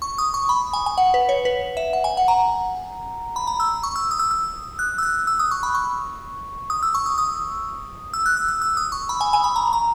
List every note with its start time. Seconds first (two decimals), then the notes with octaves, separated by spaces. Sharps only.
0.02 C#6
0.18 D#6
0.34 C#6
0.49 B5
0.73 G#5
0.86 G#5
0.98 F#5
1.14 B4
1.29 C#5
1.45 B4
1.77 E5
1.93 F#5
2.04 G#5
2.17 F#5
2.28 A#5
3.36 B5
3.47 A#5
3.60 E6
3.83 C#6
3.96 E6
4.11 D#6
4.19 E6
4.31 E6
4.79 F#6
4.98 E6
5.03 F#6
5.27 E6
5.39 D#6
5.51 C#6
5.63 B5
5.74 C#6
6.70 D#6
6.83 E6
6.94 C#6
7.06 D#6
7.18 D#6
8.13 E6
8.26 F#6
8.37 E6
8.48 E6
8.61 E6
8.77 D#6
8.92 C#6
9.09 B5
9.21 G#5
9.33 G#5
9.44 B5
9.56 A#5
9.73 A#5